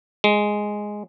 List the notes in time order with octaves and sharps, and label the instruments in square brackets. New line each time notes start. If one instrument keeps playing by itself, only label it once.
[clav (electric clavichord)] G#3